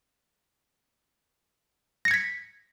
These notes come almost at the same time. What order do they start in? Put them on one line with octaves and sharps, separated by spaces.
A#6 C#7 G#6 B6